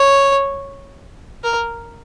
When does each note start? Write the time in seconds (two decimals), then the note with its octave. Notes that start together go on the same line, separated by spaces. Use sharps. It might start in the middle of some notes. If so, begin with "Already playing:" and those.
Already playing: C#5
1.44 A#4